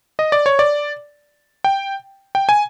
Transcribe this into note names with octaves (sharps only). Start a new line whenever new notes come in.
D#5
D5
C#5
D5
G5
G5
G#5